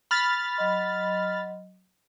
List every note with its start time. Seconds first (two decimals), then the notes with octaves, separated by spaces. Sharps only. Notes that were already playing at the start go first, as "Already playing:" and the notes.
0.11 B5 F6 A6
0.56 F#3 D#5 C6